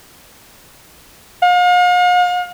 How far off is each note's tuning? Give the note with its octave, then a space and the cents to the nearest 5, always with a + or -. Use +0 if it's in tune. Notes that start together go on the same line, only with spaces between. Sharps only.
F5 +45